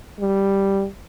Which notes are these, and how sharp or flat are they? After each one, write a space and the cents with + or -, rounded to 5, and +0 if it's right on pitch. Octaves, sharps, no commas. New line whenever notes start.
G3 +0